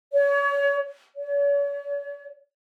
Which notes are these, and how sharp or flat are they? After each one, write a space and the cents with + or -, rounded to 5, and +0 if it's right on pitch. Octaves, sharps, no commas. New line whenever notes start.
C#5 +30
C#5 +40